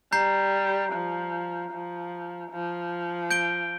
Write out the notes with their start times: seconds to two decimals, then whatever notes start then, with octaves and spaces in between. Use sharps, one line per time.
0.13 G3 A#5 G6 C7
0.92 F3
1.72 F3
2.51 F3
3.31 G6 D7 G7